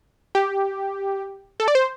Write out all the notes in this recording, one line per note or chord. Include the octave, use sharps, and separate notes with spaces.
G4
A4
D5
C5